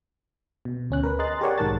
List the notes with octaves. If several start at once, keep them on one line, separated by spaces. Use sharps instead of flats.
B2
D2 C#4 F#6
A#4 B4
G#4 D#5 A#5 C6 F#6 A6
G4 G#4 A#4 C#5 D5 F#5
B1 G#2 D#3 A#4 A5 A6